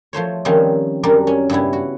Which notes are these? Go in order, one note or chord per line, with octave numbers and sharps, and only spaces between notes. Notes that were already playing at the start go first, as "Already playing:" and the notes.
F3 A3 C5 C#5
D#3 F3 G3 C4 C#4 D#4
F#2 G3 D4 A#4
C#4
G2 C#3 G3 B3 E4
F#4